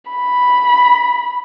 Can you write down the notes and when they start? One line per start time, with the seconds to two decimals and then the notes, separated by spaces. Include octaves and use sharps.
0.12 B5